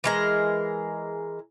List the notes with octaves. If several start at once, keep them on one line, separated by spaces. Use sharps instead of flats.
E3 G#3 A#4